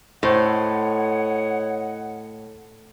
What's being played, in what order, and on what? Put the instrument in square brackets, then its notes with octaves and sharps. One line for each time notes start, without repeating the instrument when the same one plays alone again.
[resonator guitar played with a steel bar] A2 [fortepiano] C5 [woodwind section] C#5 D#5 F#5